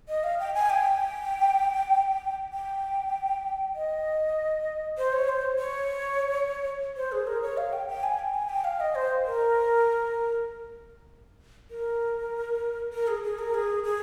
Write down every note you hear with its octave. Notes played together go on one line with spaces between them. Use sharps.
D#5
F5
G5
G#5
G5
G5
D#5
C5
C#5
C5
C#5
C5
G#4
A#4
C#5
F5
G5
G5
G#5
G5
G#5
G5
F5
D#5
C5
A#4
A#4
A#4
G#4
G#4
A#4
G#4
G#4